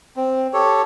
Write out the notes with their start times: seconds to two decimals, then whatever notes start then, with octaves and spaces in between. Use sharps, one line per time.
0.17 C4
0.53 G4 A4 C#5